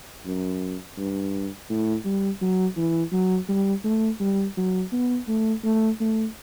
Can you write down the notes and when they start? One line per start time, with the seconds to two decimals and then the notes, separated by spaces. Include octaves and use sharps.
0.26 F#2
0.98 G2
1.70 A2
2.05 G3
2.41 F#3
2.77 E3
3.12 F#3
3.49 G3
3.84 A3
4.20 G3
4.57 F#3
4.93 B3
5.28 A3
5.64 A3
6.01 A3